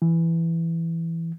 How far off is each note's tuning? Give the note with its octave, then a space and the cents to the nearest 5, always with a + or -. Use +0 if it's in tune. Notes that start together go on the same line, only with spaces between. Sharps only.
E3 +5